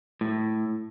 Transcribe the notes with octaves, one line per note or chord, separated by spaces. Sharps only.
A2